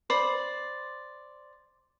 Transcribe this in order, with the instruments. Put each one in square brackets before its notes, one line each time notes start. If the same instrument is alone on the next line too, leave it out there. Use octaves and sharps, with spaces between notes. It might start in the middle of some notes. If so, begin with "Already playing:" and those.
[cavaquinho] C5 D5 B5